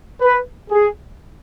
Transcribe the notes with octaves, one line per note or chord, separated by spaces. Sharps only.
B4
G#4